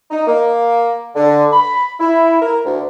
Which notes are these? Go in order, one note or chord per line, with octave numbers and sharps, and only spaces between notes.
D#4
A#3
D3
B5
E4
A#4
D2